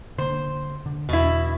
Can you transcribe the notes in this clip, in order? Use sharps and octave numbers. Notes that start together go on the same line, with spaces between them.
D3 A#3 C5
D3
E2 B2 E4